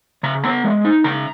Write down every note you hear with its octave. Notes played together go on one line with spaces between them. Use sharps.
C#3 A#5
B3 A#5
G#3
D#4
C#3 A#5